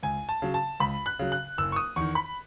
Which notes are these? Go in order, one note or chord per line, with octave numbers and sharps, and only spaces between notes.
C#2 G#5
A5
C#3 F#3
A5
C#2 B5
F#6
C#3 F#3
F#6
F#1 E6
C#6
D#6
E2 D#3 C#6
B5